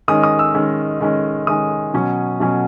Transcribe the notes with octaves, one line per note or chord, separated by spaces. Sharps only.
D#3 G#3 C#4 D#6
D#6
E6
D#3 G#3 C#4
D#3 G#3 C#4
D#3 G#3 C#4 D#6
B2 F#3 C#4
B2 F#3 C#4